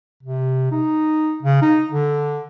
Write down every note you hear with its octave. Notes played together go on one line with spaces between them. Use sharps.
C3
D#4
C#3
D#4
D3